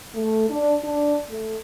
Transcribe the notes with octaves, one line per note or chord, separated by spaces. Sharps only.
A3
D4
D4
A3